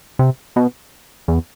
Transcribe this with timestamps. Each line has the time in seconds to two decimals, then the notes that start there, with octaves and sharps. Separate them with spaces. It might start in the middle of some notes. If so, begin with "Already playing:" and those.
0.19 C3
0.56 B2
1.28 E2